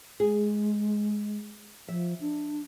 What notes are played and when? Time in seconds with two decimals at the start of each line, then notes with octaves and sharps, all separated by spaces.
0.20 G#3 G#4
1.88 F3 E5
2.21 D4